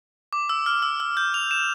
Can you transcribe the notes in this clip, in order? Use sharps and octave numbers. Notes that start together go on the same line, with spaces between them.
D6
E6
F6
E6
E6
G6
F7
E7